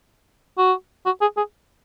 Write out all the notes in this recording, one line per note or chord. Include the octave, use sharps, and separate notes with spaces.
F#4
F#4
G#4
G#4